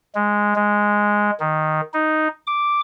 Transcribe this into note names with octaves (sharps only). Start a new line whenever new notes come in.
G#3
G#3
D#3
D#4
D6